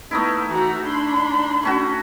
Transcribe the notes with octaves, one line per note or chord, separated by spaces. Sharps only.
A3 B3 D#4 E4
E3 F#4 A#5
D4 B5 C6
A3 C#4 F#4